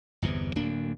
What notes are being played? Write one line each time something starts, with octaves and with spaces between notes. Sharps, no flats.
G1 E2 C3 E3
D1 D2 A#3 D4